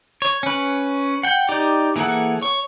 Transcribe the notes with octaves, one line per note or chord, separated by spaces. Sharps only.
C#5
C#4 B4
F#5 G5
D#4 G4 D5
E3 A#3 G#4 A4 F#5
C#5 C#6